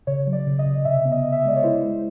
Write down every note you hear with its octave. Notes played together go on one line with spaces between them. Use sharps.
C#3 C#5
F#3
D5
C#3
D#5
C#3
C3 E5
B3 E5
D#5
B3
E5
D#5
G#3 D5
C#5
E4 C5
G#3